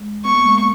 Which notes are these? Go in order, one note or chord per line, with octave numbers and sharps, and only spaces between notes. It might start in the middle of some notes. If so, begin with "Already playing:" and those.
Already playing: G#3
B3 C#6
A#3
G#3
A#3